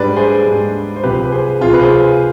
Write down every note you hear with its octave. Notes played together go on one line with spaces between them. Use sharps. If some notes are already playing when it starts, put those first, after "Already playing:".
Already playing: G#2 G3 D4 B4 D5
G#4 C5
G#2 G3 D4
C5
C2 C3 F3 C4 G4 B4
B4
G#4 C5
C2 C3 F3 C4 F4 G#4
B4
G#4 C5